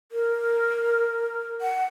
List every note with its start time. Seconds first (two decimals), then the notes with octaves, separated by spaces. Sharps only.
0.12 A#4
1.61 F#5